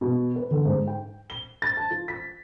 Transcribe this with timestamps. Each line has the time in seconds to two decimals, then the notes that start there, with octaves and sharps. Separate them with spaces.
0.01 B2
0.36 B4
0.51 D3
0.65 G#2
0.87 G5
1.30 G7
1.62 A6
1.77 A5
1.91 F4
2.08 B6